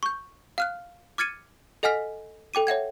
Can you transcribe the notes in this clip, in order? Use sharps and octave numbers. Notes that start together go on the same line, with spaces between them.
C#6 G6
F5 F6 F#6
D6 F6 G#6 A6 C#7 D#7
A4 D#5 F#5 G#5 F6 B6
A4 G5 D6 D#7
C#5 E5 F#5 G#6